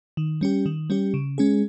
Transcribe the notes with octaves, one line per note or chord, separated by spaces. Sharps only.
D#3
G3 C#4 G4
D#3
G3 C#4 G4
C#3
G#3 C#4 G#4